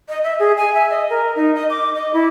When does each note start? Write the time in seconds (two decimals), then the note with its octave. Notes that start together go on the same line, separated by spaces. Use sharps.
0.09 D#5
0.24 E5
0.40 G#4
0.57 G#5
0.74 E5
0.90 D#5
1.10 A#4
1.36 D#4
1.55 D#5
1.70 D6
1.95 D#5
2.14 E4